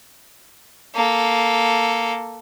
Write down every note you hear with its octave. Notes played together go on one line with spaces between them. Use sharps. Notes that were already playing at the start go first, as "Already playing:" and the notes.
A#3 A4